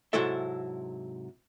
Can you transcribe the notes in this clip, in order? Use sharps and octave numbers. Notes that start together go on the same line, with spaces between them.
G#2 C3 F#3 E4 A4 E5